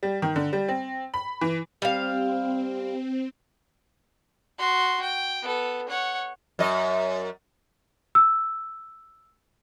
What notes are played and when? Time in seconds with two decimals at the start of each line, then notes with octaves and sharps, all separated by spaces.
0.03 G3
0.22 D#3
0.36 D3
0.53 G3
0.68 C4
1.14 B5
1.41 E3
1.82 G3 C4 F5
4.58 F#4 C6
5.02 G5
5.42 B3 A4
5.89 C#5 F#5
6.59 F#2 D#5
8.15 E6